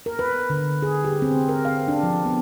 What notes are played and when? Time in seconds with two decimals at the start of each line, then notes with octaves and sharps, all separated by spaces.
0.06 A#4
0.19 B4
0.50 D3
0.82 G#4
1.05 G4
1.22 C4
1.49 A#4
1.65 F5
1.88 D4
2.03 F3
2.25 B3